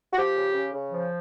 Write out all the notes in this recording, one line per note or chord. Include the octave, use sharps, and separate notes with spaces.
F#4
F3 G4
C#3
C#3
C#3
F3